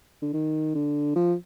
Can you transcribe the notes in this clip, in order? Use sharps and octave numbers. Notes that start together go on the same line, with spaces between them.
D3
D#3
D3
F3